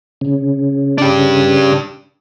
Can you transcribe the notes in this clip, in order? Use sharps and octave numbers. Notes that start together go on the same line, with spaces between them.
C#3
D4 G4